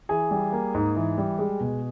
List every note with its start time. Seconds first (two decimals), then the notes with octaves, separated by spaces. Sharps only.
0.09 E3 G#4 G#5
0.31 G3
0.53 A#3
0.74 G#2
0.96 E3
1.18 G3
1.39 G#3
1.61 B2